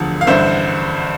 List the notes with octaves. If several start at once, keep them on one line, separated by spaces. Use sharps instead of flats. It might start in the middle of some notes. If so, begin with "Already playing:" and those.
Already playing: E1 D2 D3 F3
F5
A1 G2 D3 C5 E5